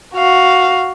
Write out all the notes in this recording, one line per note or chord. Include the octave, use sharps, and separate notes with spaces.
F#4 F5